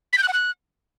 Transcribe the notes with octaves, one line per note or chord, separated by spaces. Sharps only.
B6
G6
F#6
F#5
F#6